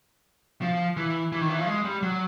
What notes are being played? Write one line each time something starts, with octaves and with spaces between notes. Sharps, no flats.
F3
E3
E3
D#3
E3
F3
G#3
G3
F#3